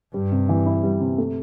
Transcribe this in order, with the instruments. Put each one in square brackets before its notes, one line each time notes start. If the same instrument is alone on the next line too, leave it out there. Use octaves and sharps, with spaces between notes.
[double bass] G2 [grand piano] G3
[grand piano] C3
E3
E4
G3
C3
A3